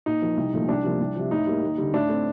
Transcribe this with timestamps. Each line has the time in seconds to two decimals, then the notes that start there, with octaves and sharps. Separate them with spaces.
0.06 A#2 D#4
0.22 F3 A#3
0.37 C2
0.53 A#2 F3 A3
0.69 C2 D4
0.84 C3 F3 A#3
1.00 C2
1.16 C3 F3
1.31 A2 D#4
1.47 G3 A#3
1.62 D#2
1.78 D3 G3
1.93 A2 D4
2.09 A3 C4